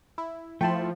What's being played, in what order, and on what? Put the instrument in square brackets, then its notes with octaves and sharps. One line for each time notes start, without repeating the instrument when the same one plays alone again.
[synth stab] E4
[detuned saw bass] F3 [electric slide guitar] A3 E4 [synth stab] G5 A5 C6